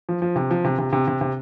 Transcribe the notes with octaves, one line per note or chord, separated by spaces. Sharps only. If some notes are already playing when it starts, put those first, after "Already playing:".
F3
F3
C3
F3
C3
C3
C3
C3
C3